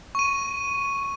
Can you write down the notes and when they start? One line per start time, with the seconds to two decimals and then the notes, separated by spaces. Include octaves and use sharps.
0.15 C#6 D#7